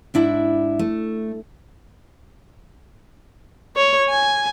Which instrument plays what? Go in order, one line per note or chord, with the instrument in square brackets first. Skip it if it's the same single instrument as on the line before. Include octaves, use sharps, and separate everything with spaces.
[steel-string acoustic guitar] G#2 D4 E4 E5
A3
[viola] C#5
G#5